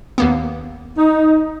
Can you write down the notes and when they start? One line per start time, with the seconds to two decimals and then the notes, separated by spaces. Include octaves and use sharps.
0.18 D#2 A#3 B3
0.97 D#4